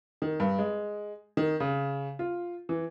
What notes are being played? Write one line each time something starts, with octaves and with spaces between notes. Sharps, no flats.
D#3
G2
G#3
D#3
C#3
F4
E3